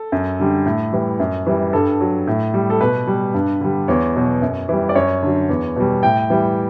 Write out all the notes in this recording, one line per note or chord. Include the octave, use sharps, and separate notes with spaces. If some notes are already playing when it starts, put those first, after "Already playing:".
Already playing: A4
F#2
D3 G3
A2
E3 G3
F#2
E3 G3
G2 A4
F#3
A2
G3
A4
B2 B4
G3
G2
D3 G3
E2 C#5
B2 F#3
F#2
E3 G3
D5
F#2 C#5
D3 F#3
E2
B2 G3
A2 G5
E3 G3